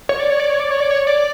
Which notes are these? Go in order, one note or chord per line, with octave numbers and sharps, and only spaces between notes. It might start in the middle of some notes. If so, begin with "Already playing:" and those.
C#5
D5
C#5
D5
C#5
D5
C#5
D5
C#5
D5